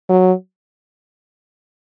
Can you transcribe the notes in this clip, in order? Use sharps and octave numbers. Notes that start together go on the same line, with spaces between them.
F#3